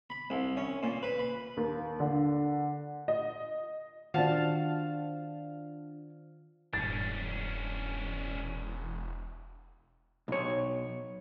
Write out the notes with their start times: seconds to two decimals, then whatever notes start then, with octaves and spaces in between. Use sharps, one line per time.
0.10 B5
0.30 C2
0.57 C#4
0.83 A#2
1.03 B4
1.19 B5
1.57 D#2
2.00 D3
3.08 D#5
4.14 D#3 D4 F4 F#4 C5 F5 A5
6.74 E1 G2 A#2 C#4 D4 A6
10.28 B1 C#5